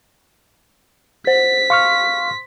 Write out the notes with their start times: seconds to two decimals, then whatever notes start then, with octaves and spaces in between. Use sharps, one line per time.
1.27 C5 B6
1.70 F5 C6 C#6 F6